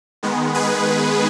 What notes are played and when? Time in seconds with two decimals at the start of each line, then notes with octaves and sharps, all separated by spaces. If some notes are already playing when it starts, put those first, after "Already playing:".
0.23 D#3 G#3 B3
0.54 G#4 B4